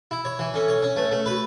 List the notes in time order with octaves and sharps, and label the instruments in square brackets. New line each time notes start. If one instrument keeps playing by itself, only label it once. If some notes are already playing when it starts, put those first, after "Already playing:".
[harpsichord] E4
C#5
E3
[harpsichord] C#4 [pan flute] A4
[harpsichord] C#5
C#4
[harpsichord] A3 [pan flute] B4
[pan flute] A4
[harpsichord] A3
[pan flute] A4
[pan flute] F#4 [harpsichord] B4